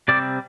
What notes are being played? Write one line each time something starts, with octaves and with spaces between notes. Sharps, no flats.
C3 G3 C4 D5